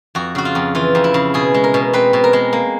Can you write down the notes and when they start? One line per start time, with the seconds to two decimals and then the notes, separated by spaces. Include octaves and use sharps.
0.15 F2 F#4
0.35 C#3 F#4
0.45 F4
0.55 F2
0.75 E3 F4
0.95 F2
1.04 E4
1.14 C#3
1.34 B2 G#4
1.54 G#3
1.64 A#4
1.74 B2
1.93 C4 B4
2.13 B2
2.24 A#4
2.33 G#3
2.53 A#3